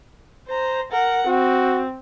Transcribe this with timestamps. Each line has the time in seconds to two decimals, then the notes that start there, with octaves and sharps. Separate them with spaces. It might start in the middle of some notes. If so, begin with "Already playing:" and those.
0.48 C5 A#5
0.91 A#4 F#5
1.27 C4 F#4